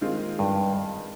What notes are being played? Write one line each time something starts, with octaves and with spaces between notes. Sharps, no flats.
D#3 G#3 C4 F4
G2